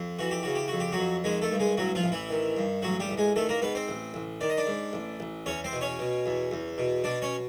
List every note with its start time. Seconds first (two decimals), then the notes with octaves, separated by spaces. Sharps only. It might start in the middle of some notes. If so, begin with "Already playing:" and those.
Already playing: F2
0.19 E3 F#4
0.31 G4
0.43 C#3 F#4
0.55 G4
0.68 F2 F#4
0.80 G4
0.92 F#3 F#4
0.98 F2
1.24 D#3 G#3 G#4
1.42 A3 A4
1.51 G2
1.60 G#3 G#4
1.78 A1 F#3 F#4
1.95 F3 F4
2.04 A1
2.12 E3 E4
2.30 D#3
2.57 G2
2.82 A1 F#3 F#4
3.00 G3 G4
3.09 A1
3.17 G#3 G#4
3.36 D#3 A3 A4
3.49 A#3 A#4
3.62 G#2 B3 B4
3.75 C4 C5
3.88 A1
4.14 A1
4.41 D#3 D5
4.50 D#5
4.57 D4 D5
4.67 G#2
4.93 A1
5.20 A1
5.46 E2 C#4 C#5
5.64 C4 C5
5.73 B2
5.81 C#4 C#5
5.99 B2
6.26 E2
6.52 E2
6.78 B2
7.04 B2 D4 D5
7.22 C#4 C#5